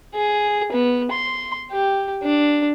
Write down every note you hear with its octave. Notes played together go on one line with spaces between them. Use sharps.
G#4
B3
C6
G4
D4